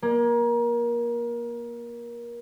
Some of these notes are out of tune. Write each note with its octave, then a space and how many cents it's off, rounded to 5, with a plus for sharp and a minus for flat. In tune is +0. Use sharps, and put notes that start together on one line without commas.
A#3 +25